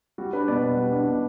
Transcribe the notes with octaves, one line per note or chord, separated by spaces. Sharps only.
G3 F#4
D4 B4
B2 D5
B2 B4
G3
D4
B2